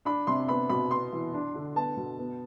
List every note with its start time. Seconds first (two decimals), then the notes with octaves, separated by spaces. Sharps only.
0.05 D4 B5
0.27 C3 C6
0.49 B3 B5
0.69 B2 B5
0.90 B3 C6
1.12 E3
1.34 D4
1.55 D3
1.76 B3 A5
1.97 B2
2.18 B3